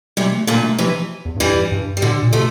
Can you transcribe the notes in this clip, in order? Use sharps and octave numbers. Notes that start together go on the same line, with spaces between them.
C3 E3 G3
A3
A#2 D3 A#3
A3
C3 E3 F3
E2
G2
F2 E3 G3
G2
G3
A2 D3 F3
A#2
C3 F3 A3